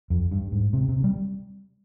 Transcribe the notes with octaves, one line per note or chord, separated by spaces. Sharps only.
F2
G2
G#2
C3
C3
G3